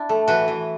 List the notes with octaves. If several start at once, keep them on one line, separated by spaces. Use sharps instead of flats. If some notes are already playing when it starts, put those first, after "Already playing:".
Already playing: D4 E4
A3
E3 F#4 B4
E3